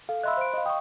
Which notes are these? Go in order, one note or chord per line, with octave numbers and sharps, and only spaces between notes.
A4 F5
D#5 E5 B5 C6 E6 F#6
C5 D7
D#5 F5
G5 C#6 D#6